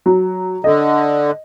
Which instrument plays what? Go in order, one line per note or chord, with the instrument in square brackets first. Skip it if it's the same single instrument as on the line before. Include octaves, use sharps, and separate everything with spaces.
[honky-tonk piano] F#3
[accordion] D3 [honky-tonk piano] D#5